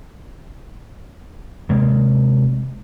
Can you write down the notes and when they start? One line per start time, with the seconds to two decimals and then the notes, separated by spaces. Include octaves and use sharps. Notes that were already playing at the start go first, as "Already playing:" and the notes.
1.69 C3 G#3 A#3